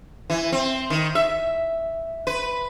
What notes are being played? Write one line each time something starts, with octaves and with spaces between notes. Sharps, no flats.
E3
C4
D#3
E5
B4